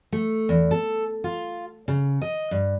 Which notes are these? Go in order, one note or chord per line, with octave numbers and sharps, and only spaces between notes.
A3
E2
A4
F4
C#3
D#5
G2